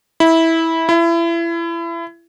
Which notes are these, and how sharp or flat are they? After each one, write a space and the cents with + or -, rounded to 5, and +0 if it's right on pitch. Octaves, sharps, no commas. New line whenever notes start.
E4 -15
E4 +30